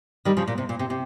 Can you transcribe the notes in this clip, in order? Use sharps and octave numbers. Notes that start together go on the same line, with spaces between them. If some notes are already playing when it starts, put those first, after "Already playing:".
D#3 G3
C#3 F3
A#2
C3
A#2
C3
C3